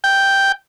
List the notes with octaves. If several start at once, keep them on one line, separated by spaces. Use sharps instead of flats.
G5